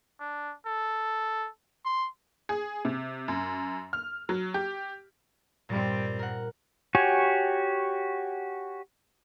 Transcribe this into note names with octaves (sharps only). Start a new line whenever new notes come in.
D4
A4
C6
G#4
C3
F#2
F6
F#3
G4
G2 A#2 G3 C4
A#4 F#5
F#4 G4 C#5 G#5